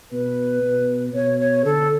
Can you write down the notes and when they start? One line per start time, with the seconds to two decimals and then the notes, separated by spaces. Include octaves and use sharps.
0.11 B2 B4
0.63 B2
1.14 B2 C#5
1.39 C#5
1.65 D3 A4